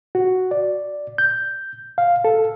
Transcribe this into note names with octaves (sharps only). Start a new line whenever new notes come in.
F#4
D5
G6
F5
A4